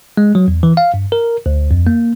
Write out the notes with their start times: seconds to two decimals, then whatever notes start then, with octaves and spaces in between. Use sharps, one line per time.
0.17 G#3
0.35 F#3
0.48 E2
0.63 E3
0.77 F5
0.94 G2
1.12 A#4
1.46 D2
1.71 F2
1.87 A#3